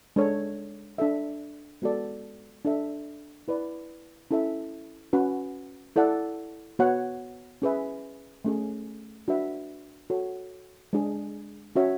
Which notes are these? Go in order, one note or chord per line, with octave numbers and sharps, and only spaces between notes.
G#3 D4 A4 C#5
D4 A4 E5
G#3 B3 F#4 A4 D5
D4 A4 E5
E4 B4 D5
C#4 E4 A4 E5
C#4 F#4 B4 F#5
E4 A4 D5 F#5
B3 F#4 C#5 F#5
C#4 G#4 B4 E5
A3 C#4 G#4
D4 F#4 B4 E5
F#4 A4 C#5
G#3 D4 G#4
C#4 F#4 C#5 E5